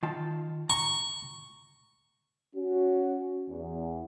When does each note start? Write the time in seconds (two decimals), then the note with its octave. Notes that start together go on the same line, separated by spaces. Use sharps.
0.03 D#3 F4 A5
0.70 A#5 C#6
2.55 C#4 F#4
3.49 E2